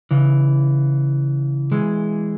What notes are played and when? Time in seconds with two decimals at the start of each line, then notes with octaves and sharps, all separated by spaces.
0.11 C#3 E3
1.72 E3 G#3